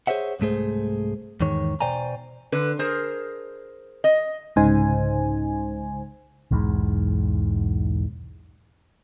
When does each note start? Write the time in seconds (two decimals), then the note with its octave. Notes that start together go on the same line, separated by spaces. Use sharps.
0.07 G#4 C5 C#5 E5 F#5
0.40 C2 G#2 A3 G#4 C5
1.41 E2 G#2 D#3 C#5
1.80 B2 C5 D5 G5 G#5 A#5
2.52 D3 B4
2.79 G#4 A#4 C5
4.04 D#5
4.56 C2 G#2 C#3 D#4 C5 G#5
6.51 B1 E2 G#2